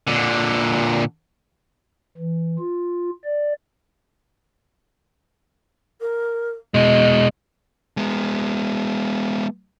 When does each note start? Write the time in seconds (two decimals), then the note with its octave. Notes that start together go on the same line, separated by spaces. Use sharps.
0.08 A#2 D3
2.18 E3
2.59 F4
3.24 D5
6.01 A#4
6.74 B2 G#3 D#5
7.97 G#3 B3